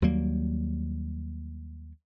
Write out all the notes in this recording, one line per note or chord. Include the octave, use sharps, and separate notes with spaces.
D#2 F#3 G3 A#3